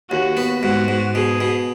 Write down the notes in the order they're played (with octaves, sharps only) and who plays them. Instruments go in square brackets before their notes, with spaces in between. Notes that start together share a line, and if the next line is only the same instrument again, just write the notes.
[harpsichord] D#2 [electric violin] F#4
[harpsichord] B3
[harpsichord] G#2 [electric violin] F#4
[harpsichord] G#2
[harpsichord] B2 [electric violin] G#4
[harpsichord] B2